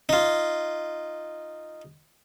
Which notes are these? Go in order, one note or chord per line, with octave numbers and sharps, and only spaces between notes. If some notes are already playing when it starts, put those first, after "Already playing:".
D#4 F4